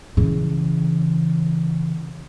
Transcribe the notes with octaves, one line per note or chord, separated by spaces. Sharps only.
C#3 E3